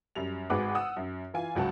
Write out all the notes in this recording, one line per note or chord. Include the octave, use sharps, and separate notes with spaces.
F#2 G3 F7
G#1 G#3 F#4 B4 F#5 D6
F#5 D#6 E6
F#2
E3 F4 G#5
G#1 C#2 F#3 F#5 A5